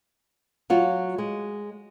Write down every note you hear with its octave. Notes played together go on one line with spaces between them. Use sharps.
F#3 F4 F#4
G#3